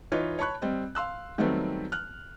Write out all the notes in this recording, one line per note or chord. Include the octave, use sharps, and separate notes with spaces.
E3 D#4 F4 B4 C#5
C#5 A5 B5 C#6 F#6
G3 C4 D#5
F5 C6 E6 F#6
D#3 F#3 G3 A3 B3 C4
F6 F#6